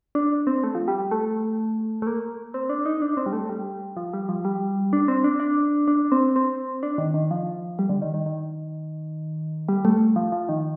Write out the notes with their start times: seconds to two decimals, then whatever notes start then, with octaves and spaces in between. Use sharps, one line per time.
0.15 D4
0.47 C4
0.64 A3
0.75 F3
0.88 G3
1.11 A3
2.02 A3
2.07 A#3
2.54 C4
2.69 D4
2.86 D#4
3.02 D4
3.17 C4
3.26 G3
3.33 A3
3.49 G3
3.97 F3
4.13 G3
4.29 F3
4.45 G3
4.93 D4
5.08 C4
5.24 D4
5.40 D4
5.88 D4
6.12 C4
6.36 C4
6.83 D4
6.98 D#3
7.14 D#3
7.31 F3
7.79 G3
7.89 D3
8.02 D#3
8.14 D#3
8.26 D#3
9.68 G3
9.85 A3
10.16 F3
10.32 F3
10.49 D#3